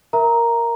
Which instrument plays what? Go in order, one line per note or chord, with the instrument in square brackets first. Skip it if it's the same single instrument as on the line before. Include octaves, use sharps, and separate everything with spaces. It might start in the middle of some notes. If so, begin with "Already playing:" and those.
[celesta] A#4 E5 A#5